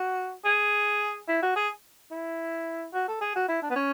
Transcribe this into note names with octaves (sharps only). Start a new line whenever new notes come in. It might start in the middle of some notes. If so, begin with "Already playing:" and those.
Already playing: F#4
G#4
E4
F#4
G#4
E4
F#4
A4
G#4
F#4
E4
D4
B3
C#4